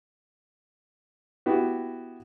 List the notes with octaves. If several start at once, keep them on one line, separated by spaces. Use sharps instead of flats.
B3 E4 F#4 G4